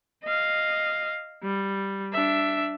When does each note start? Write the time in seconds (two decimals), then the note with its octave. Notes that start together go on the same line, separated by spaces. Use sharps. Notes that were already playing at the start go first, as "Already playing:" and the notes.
0.24 D#5 F5
1.43 G3
2.13 D4 E5